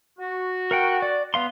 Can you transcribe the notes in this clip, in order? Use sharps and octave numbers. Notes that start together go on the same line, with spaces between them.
F#4
A#4 F#5 G5
D5
B3 F5 C6